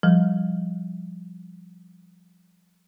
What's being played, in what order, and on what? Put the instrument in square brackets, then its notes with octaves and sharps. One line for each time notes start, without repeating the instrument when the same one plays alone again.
[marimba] F3 G3